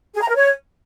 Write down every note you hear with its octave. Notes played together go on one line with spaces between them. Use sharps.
G#4
A#5
A#4
C#5